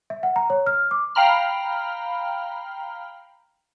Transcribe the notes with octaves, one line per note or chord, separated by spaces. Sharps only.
E5
F#5
A#5
C#5
F6
D6
F5 G5 A#5 B5 F6